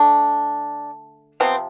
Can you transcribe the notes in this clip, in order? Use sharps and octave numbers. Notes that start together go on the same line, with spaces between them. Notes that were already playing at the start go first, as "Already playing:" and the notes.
Already playing: D3 A3 D4
C3 F3 B3 C4